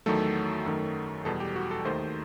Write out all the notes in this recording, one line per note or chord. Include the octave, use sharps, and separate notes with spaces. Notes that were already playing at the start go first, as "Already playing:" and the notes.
E2 D#3 F#3 A3 A4
F#2 D#3 F#3 A3
E2 B2 G3 A4
G4
F#4
A4
D#2 D#3 A3 C5